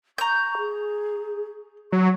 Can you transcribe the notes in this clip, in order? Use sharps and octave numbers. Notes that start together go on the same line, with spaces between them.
A#5 C#6 G6
G#4
F#3 C#6